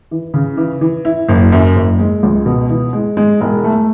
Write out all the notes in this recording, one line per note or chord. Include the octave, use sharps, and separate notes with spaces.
E3
C#3
E3
E3
E4
F#1
F#2
F#1
G#3
C#2
B2
E3
G#3
G#3
E1
A3